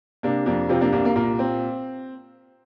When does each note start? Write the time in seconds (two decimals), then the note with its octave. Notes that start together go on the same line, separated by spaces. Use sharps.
0.23 C3 A#3 D4
0.46 F2 A#3 D4
0.69 C3 C4 F4
0.81 A#3 D4
0.92 C2 A#3 D4
1.05 A#3
1.16 A#2 A#3
1.39 C4